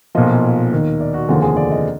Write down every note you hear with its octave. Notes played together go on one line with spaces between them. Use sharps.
B1 A#2 F3 D#5
D#2 D#3
D5
F#4
F1 D#2 D3 F3 G#4
G#4
D5
D#5